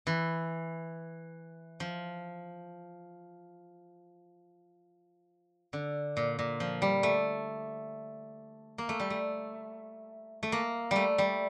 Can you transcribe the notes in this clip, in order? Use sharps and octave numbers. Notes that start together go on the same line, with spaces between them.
E3
F3
D3
A#2
A#2
F3
G3
A3
A#3
A3
G3
A3
A3
A#3
G3 A3
G3